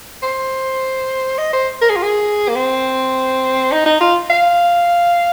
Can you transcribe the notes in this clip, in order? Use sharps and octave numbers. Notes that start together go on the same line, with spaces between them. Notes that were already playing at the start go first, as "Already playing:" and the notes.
C5
D#5
C5
A#4
G#4
F4
G#4
A#3
C4
D#4
D#4
F4
F5